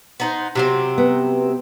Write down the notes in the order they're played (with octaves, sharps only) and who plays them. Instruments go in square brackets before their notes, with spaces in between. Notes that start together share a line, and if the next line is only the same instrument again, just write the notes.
[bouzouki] B3 D#4 C5
C3 F#3 C4
[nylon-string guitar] B3